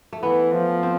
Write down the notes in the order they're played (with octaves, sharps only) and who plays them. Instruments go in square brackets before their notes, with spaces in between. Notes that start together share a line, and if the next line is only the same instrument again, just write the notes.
[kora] A3
[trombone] E3 [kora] B3
[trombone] F3
[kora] C4